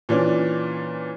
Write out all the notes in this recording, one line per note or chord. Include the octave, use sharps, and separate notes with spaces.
A#2 E3 C#4 D4